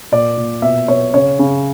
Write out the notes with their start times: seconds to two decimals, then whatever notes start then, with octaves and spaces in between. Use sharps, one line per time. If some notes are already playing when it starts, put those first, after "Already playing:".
0.12 A#2 D5
0.37 A#2
0.62 B2 E5
0.88 B2 C#5
1.14 C#3 C#5
1.39 C#3